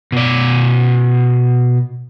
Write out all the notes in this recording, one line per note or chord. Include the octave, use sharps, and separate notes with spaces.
B2 D5